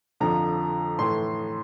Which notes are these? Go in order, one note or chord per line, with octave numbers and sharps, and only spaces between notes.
F2 D3 F3 A#5
A2 E3 C6